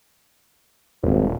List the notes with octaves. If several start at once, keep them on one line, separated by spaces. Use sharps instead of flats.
D#1 G#1